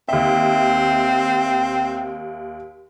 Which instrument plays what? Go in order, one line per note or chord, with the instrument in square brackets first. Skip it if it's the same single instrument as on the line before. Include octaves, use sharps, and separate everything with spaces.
[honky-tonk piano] D#2 E5 [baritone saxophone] C4